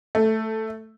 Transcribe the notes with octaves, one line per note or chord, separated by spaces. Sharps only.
A3